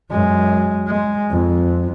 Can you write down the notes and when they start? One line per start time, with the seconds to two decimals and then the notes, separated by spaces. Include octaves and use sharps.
0.11 F#2 G#3
0.88 G#3
1.30 F2